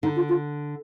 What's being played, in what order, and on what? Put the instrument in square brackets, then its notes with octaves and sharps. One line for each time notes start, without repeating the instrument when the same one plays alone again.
[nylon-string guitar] D3 [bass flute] D#4
[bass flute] F4
F4